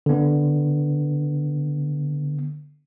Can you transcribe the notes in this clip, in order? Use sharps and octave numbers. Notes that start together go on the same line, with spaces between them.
D3 B3